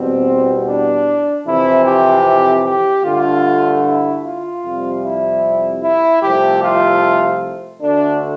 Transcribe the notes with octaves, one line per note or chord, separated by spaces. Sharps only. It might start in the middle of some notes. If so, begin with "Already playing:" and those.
Already playing: E2 B2 G3 C4
D4
F2 C3 E3 E4
G4
G4
G2 D3 A3 F4
E4
F4
F2 C3 G3
E4
E4
C2 C3 F3 A3 G4
F4
D2 D3 A3 D4